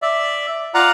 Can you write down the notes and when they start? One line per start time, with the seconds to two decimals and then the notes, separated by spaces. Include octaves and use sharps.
0.02 D5 E5
0.74 F4 D5 F5 F#5 A#5